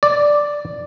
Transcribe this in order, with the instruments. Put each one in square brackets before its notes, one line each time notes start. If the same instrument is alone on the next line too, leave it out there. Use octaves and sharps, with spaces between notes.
[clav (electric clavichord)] D5